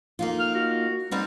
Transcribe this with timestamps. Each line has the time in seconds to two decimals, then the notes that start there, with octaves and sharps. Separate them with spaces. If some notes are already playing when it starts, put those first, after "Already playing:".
0.19 A#3 D#4 F4
0.40 F6
0.55 F#4
1.11 G3 B3 C4 D#4